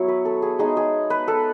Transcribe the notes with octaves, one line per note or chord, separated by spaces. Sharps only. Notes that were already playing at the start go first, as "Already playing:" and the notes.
Already playing: F#3 B3 E4 C#5
B4
A4
G#4
G#3 B3 D#4 G#4
G#4
B4
A4